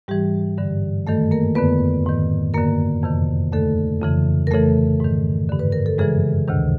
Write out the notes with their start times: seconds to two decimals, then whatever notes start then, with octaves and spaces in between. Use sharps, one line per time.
0.08 G#2 E3 G3 G4
0.58 G2 D3
1.07 F#2 D#3 A3 A4
1.31 A#3 A#4
1.55 F2 D3 B3 B4
2.06 G#2 D#3
2.54 F#2 D3 A#3 A#4
3.03 F2 C3 D#3
3.52 D#2 D3 A3 A4
4.02 F2 C#3 E3
4.47 A#4
4.51 F2 C#3 E3 A3 A4
5.00 G#2 D#3
5.49 G2 D3
5.59 B4
5.72 A#4
5.86 A4
5.98 F#2 C#3 E3 G#3 G#4
6.47 D2 C3 D#3